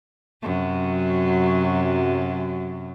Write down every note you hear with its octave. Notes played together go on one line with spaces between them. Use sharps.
F#2 C3 F#3